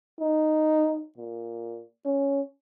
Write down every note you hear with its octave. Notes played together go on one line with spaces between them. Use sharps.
D#4
A#2
C#4